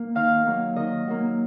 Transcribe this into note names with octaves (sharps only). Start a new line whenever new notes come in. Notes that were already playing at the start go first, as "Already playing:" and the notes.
Already playing: A#3
D#3 F5
F#3 A#3
D#3 D#5
F#3 A#3